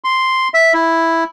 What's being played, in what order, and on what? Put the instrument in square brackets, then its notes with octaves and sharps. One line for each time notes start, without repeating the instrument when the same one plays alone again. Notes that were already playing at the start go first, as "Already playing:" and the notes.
[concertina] C6
E5
E4